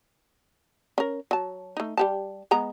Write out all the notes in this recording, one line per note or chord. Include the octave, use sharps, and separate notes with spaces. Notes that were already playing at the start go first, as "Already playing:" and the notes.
C#4 A#4
F#3 A5
A3 D#4
G3 G4 A5
G#3 B3 A#5